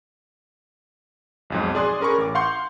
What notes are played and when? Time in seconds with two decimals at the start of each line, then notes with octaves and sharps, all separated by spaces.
1.50 B1 F2 G#2
1.75 G#4 D5 C6 F#6
2.00 C#4 G#4 A#4 B5 C#6
2.18 A1 D6
2.35 F5 F#5 C6 C#6 G6